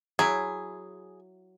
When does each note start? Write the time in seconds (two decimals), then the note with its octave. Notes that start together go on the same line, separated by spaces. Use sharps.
0.19 F#3 E4 G#4